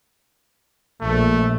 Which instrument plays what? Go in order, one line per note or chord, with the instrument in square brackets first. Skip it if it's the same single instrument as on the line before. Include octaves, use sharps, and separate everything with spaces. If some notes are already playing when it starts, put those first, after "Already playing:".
[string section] A#1 [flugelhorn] A3